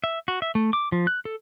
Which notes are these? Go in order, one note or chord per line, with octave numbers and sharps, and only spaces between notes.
E5
F#4
E5
A3
D6
F3
F#6
A4